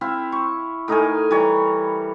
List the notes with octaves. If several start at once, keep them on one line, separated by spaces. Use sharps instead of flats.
C4 E4 E5 F5
C#6
A2 D#4 A#4 G#5
E3 G3 C#5 A#5